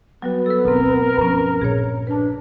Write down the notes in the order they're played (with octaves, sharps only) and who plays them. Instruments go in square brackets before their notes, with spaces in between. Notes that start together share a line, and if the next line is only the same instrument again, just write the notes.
[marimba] F#3 G3 F#4 [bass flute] B3
[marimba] A4 B4 [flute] E6
[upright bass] G1 D2 [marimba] B2 C4 [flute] A#4
[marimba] G2 C#4 [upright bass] F3
[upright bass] A#1 [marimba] G#4 C#5
[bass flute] D4 [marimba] B4 A5